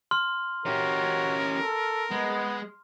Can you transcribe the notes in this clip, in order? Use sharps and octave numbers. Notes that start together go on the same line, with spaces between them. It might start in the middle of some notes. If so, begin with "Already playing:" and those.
C6 F6
C#4 F#4 G4 A#4
A4
G#3 B3